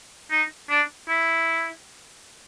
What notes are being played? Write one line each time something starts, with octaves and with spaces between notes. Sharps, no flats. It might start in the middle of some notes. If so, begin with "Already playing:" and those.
D#4
D4
E4